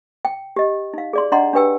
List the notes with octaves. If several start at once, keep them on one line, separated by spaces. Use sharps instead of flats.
G5
G4 D#5
D#4 F5
G#4 D5 C6
D4 D5 D#5 F#5 A#5 C6
D4 G4 B4 G5 E6